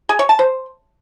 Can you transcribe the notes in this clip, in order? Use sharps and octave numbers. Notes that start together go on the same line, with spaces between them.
G#4
C#5
A5
C5